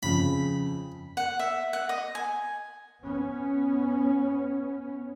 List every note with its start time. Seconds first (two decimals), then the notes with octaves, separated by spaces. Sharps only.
0.03 F2 C#3 B5
1.17 F#5
1.39 E5
1.73 F#5
1.89 D#5
2.15 G#5
3.02 B3 C#4